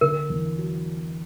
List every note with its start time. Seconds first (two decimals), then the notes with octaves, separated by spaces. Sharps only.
0.01 D3 A#4
0.30 E2
0.58 F#3